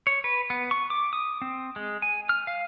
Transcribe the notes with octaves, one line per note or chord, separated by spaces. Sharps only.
C#5
B4
B3
C#6
D6
D#6
C4
G#3
G#5
F6
F5